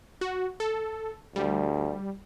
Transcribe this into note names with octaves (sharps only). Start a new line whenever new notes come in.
F#4
A4
D2 G3